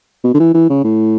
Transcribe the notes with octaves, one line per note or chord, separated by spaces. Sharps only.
B2
D3
E3
E3
C#3
A2